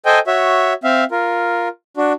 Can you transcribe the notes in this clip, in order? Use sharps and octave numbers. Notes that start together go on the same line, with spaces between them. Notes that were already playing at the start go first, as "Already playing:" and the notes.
A4 C5 D#5 G5 G#5
F#4 C#5 E5
C4 E5 F5
F4 A#4
D4 F#4